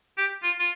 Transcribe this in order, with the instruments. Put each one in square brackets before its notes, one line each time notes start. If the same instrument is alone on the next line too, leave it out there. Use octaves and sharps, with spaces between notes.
[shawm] G4
F4
F4